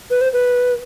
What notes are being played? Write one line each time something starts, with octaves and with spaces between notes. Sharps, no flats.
B4
C5
B4